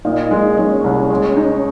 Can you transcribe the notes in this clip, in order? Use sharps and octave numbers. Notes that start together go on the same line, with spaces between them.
A#2 D#4
G#3
G#3 C#4
C2
G#3
D#4